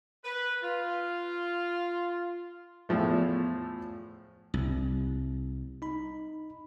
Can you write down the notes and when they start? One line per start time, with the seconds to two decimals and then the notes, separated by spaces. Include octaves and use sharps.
0.23 B4
0.62 F4
2.89 E2 A2 F3 A3
4.54 C2
5.82 D#4 B5